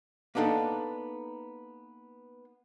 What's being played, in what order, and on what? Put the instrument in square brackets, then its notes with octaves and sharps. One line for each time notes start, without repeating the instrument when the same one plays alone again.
[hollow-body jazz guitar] A#3 B3 D4 D#4 A4